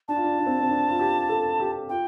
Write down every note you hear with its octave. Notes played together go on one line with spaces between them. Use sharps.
D4 A5
F4
D4
D4
C4
C4
D4
F4
G4
A4
G4
F4 G5